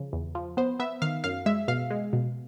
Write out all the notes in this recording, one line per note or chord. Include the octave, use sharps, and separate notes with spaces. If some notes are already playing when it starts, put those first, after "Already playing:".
Already playing: C#3 F3
E2
F3
B3 C5
B3 E5
D#3 F5
F#2 F5
G#3 E5
B2 F5
G#3
B2